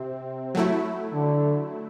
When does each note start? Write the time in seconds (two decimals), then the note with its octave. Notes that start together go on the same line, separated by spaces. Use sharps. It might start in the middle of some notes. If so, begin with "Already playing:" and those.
Already playing: C3 C4
0.55 F#3 A3 E4
1.13 D3